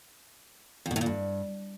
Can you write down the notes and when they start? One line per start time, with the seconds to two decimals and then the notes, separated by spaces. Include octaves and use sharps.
0.86 F2
0.91 B2
0.96 A2
1.01 A#2
1.06 G2